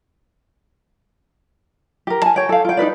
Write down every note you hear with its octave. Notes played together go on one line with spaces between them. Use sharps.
G4 A#4
G#5 A5
C#5 G5
A4 F5
F4 G5
D#4 A#4 B4 D5